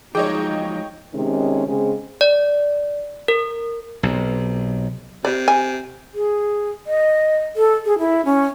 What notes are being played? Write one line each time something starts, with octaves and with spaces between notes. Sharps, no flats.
F3 F#3 G#3 D#4 G#4 C#5 D#5 G5
C3 D#3 G#3 C#4
C#3 G#3 C4 C#4 G#4
D5
A#4
B1 C3
C3 D5
G#5
G#4
D#5
A4
G#4
E4
C#4